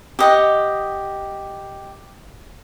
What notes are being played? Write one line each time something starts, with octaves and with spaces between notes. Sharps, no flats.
G4 D#5 F#5